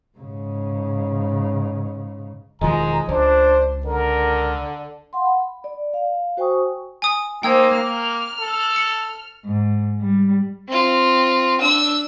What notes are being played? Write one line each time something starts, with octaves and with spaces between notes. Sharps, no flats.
G#2 C#3
E1 D#3 F3 G#3 A#5
C#2 D4 C5
D3 A#4
F5 F#5 C6
B5
D5
F5
F#4 C5 G5 G#5 C#6 D#6
G#5 D#6
A#3 D#4 C5 G5 E6 G#6
A#3 F6
A4
C#7
G#2
G3
C4 F4
D4 E6